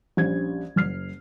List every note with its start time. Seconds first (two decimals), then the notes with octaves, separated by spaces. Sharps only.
0.17 A#1 G3 C#4 D4 G#6
0.76 F#1 F6 C7